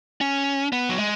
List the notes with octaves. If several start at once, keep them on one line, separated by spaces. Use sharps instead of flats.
C#4
B3
F#3
G#3